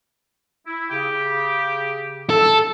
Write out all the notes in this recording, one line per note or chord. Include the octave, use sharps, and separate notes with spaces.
E4
C#3 G4
A4 E6